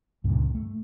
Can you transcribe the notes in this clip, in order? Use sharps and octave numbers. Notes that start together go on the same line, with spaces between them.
C#2 G2 A#2
A3